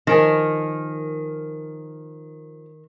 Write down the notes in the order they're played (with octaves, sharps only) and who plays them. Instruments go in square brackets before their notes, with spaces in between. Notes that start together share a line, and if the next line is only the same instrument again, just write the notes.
[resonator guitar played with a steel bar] D#3 [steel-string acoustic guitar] F3 A#4 G#5